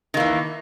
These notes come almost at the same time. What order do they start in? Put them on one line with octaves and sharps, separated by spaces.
D#3 A#3 E3